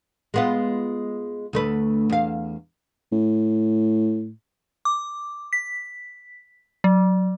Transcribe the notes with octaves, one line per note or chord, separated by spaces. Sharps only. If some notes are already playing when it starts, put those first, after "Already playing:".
G#3 B3 F4
D2 A3 B4
E2 F5
A2
D6
B6
F#3